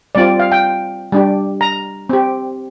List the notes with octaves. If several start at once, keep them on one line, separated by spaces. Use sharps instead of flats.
G3 C4 F4 D5
F5
G5
G3 D4 G4
A#5
C4 G4